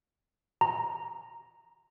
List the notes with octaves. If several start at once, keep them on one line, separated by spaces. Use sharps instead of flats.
A#5